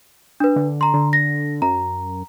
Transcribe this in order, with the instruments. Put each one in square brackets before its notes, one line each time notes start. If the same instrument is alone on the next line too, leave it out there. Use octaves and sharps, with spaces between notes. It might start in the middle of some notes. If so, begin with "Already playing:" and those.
[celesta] D4 B4
[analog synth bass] D3
[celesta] A#5 C6
[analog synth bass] D3
[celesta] A#6
[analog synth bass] F#2 [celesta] A#5